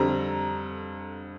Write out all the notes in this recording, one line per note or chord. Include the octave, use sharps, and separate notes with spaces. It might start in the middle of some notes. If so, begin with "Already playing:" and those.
Already playing: F2 D3 G3 A#5